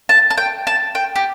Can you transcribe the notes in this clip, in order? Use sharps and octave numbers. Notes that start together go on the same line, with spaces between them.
A5
A5
G5
A5
G5
G4